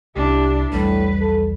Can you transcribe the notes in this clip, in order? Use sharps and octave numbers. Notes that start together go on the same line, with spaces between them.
C2 D4 E4 G4
B1 E2 A2 G3 B4
A4